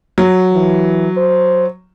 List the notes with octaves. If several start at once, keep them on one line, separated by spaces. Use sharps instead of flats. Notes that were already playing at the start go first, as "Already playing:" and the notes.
F#3
E3
C5